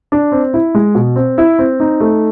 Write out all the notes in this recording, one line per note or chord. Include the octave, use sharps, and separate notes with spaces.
D4
C4
E4
G#3
B2
C4
E4
C4
D#4
A3